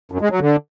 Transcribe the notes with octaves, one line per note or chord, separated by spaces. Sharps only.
F#2
G#3
F#3
D3